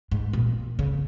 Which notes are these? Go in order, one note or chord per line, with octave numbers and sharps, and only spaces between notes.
G#2
A#2
C#3